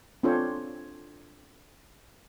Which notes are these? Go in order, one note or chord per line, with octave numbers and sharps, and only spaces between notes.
C4 D4 F4 A4 C5 C#5